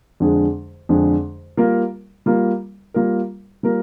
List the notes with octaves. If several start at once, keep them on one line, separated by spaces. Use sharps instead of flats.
F2 D3 G#3 D4 G#4
F2 D3 G#3 D4 G#4
G3 A#3 F4 A#4
G3 A#3 F4 A#4
G3 A#3 F4 A#4
G3 A#3 F4 A#4